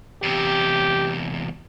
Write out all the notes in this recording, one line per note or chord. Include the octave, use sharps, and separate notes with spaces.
E2 C3 G4